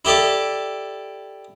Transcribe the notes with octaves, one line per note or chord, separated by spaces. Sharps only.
E4 G4 A4 D5